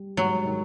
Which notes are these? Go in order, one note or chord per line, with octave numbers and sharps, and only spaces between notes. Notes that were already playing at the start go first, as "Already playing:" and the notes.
Already playing: G3
G#2 F#3
D#3